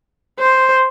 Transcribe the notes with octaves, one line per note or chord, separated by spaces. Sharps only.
C5